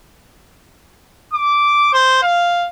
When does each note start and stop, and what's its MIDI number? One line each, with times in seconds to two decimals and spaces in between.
1.33 1.91 86
1.93 2.20 72
2.22 2.68 77